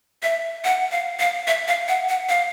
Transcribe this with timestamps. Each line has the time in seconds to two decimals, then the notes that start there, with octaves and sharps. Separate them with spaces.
0.23 E5
0.65 F#5
0.91 F5
1.19 F5
1.47 E5
1.68 F5
1.88 F#5
2.09 F#5
2.29 F5